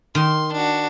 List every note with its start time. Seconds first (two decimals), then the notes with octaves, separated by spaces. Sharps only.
0.15 D#3 C6
0.52 D4 F#4